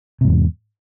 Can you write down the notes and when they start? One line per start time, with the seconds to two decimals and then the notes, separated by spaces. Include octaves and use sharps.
0.21 C3
0.24 G#2
0.28 E2